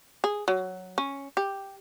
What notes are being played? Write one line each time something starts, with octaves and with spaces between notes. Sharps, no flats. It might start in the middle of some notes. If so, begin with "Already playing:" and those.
G#4
F#3
C#4
G4